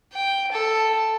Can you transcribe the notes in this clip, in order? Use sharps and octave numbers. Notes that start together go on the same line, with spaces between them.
G5
A4